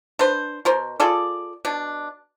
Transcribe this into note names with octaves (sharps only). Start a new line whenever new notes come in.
D4 B4 C5
B2 A#4 C5
F4 G#4 A4 D5
B2 D4